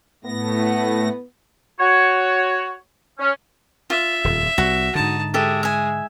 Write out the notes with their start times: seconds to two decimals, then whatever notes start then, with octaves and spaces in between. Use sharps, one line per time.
0.24 A2 A3 B3 A#6
1.79 F#4 C#5
3.19 C#4
3.90 F4 E5
4.24 D#1 F2
4.58 C2 F#4
4.95 G#2 D3 D#4 A5
5.34 G#3 G4 A4 E5
5.63 E5 G#5